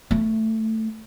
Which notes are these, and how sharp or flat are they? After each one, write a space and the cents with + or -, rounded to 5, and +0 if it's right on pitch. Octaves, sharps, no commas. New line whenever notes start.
A3 +10